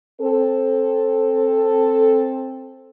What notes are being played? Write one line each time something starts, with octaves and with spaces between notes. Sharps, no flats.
C4 A4